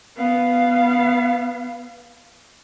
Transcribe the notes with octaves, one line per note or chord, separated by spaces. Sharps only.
B3 F5